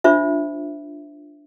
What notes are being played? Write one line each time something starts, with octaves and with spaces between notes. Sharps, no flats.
D4 F4 C5 E5